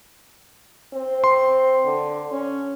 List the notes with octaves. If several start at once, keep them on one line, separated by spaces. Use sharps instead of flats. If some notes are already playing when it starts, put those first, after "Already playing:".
C4
C6
D3
C#4